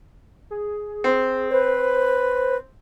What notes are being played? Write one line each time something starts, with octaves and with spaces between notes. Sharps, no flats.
G#4
C4
B4 C5